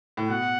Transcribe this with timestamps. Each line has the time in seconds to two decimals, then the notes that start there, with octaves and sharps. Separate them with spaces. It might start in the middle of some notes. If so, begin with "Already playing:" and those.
0.17 A2
0.29 B2 F#5